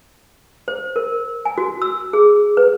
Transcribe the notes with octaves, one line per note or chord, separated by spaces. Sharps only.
C5
A#4
G#5
F#4
E6
G#4
B4